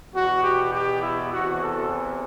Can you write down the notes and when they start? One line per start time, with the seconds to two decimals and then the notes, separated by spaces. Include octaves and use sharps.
0.14 E2 B2 F#4
0.43 G4
0.73 G4
1.03 E4
1.32 E2 C3 E3 F#4
1.62 A4